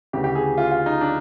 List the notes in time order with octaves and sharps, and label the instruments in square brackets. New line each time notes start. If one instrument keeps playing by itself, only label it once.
[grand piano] D2 C#3 E3 G4
G4
G#4
F4
F4
D#4
D4